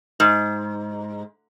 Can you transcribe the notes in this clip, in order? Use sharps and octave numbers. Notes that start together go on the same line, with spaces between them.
G#2